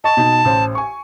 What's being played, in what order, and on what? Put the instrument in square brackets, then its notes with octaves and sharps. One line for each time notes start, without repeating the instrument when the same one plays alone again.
[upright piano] D#5 C#6 [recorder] A5
[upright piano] B2 D#4
A1 C5
G#5 C#6